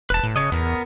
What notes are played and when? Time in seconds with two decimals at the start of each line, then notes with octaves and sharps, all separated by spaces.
0.10 E1 B4 A5
0.23 A2
0.36 C#3 C#5 D#5
0.52 E2 B3 A#4